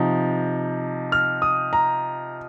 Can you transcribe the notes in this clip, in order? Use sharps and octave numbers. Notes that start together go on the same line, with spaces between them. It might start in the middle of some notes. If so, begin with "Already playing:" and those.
Already playing: C3 F3 D#4
F6
D#6
A#5